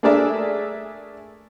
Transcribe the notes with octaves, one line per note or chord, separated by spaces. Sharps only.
A3 D4 G#4 A#4 D5 E5